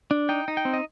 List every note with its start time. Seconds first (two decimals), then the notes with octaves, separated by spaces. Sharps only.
0.11 D4
0.29 D#4 G5
0.48 D#4
0.57 G5
0.65 C4
0.73 D#5